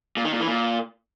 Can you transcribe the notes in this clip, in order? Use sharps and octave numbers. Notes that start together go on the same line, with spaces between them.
A#2
D#3
A#2
E3
A#2